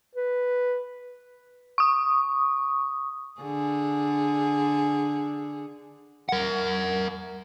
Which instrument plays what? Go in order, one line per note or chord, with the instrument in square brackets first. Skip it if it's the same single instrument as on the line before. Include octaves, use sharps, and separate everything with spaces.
[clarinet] B4
[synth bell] C#6 D#6
[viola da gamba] D3 G#4
[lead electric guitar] A#4 F#5